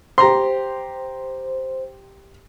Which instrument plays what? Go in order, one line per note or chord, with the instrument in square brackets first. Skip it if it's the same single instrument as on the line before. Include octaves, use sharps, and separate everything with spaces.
[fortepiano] G4 A#5 C6 [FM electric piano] C5